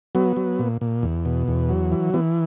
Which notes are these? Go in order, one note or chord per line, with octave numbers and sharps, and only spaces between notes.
F#3 B3
F#3
A#2
A#2
E2
B2
E2
F#3
E3
E3 B3